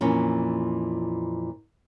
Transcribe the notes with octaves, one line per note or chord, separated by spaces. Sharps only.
F2 A#2 E3 C#4